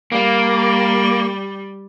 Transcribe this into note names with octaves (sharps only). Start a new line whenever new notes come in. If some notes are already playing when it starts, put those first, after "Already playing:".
G3 A#3